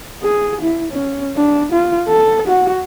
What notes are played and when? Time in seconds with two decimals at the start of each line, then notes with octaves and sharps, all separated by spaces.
0.23 G#4
0.61 E4
0.92 C#4
1.36 D4
1.72 F4
2.08 A4
2.48 F#4